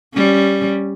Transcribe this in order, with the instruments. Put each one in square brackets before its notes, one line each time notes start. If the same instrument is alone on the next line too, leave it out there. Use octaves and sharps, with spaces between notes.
[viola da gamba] G3 C#4